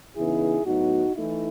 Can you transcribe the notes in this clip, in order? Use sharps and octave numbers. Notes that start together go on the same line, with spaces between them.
C#3 E3 B3 D#4 E4 G#4
A2 F#3 B3 D#4 F#4
E3 A3 D#4 E4